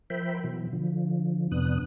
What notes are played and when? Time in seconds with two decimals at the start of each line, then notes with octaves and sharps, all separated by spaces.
0.10 F3 A#4 C5 E5 G5 B5
0.44 B2 E3 F#3
0.73 D3 F3
1.51 F2 C3 B3 D4 D#6 F#6